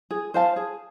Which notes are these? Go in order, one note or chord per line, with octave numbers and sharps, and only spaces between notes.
G#4
C5 F5 A5
G#4